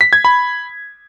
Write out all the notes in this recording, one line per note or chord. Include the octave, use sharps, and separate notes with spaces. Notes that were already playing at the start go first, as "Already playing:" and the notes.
B6
G#6
B5